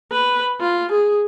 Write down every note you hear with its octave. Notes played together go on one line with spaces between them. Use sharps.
B4
F4
G#4